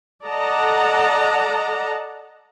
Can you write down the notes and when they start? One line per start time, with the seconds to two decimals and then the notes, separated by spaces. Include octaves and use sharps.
0.24 A4 D5 D#5 F#5 A5 A#5